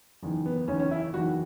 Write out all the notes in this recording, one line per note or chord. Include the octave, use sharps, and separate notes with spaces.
F#1 E2 D#3
B3
F#1 E2 D#3 C#4
C#4
E4
F#1 E2 D#3 F#4